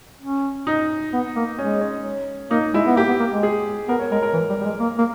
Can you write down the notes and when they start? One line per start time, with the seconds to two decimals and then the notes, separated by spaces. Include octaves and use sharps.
0.22 C#4
0.67 D#4
1.13 B3
1.36 A#3
1.58 G#3 C#4
1.81 C#4
2.51 A#3 D#4
2.74 G#3 E4
2.86 B3
2.97 A#3 G4
3.08 B3
3.20 A#3
3.31 G#3
3.43 G#4
3.88 B3 A#4
3.99 C#5
4.11 G#3 A#4
4.23 A#4
4.34 E3
4.49 G3
4.61 G3
4.65 G#3
4.80 A#3
4.98 A#3